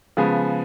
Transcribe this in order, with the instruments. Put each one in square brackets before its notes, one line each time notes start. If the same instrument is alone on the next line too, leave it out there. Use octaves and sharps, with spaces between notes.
[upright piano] C#3 F3 G#3 B3